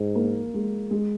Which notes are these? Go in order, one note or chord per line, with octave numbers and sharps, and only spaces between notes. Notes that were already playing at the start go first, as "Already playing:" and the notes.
Already playing: G#2
A#3
G#3
G#3